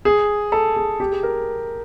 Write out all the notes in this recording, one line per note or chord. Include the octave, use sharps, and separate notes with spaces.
G#4
A4
G#4
G4
G#4
A#4